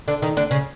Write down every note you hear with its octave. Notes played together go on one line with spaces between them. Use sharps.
D3 D4
D#3 D#4
D3 D4
C#3 C#4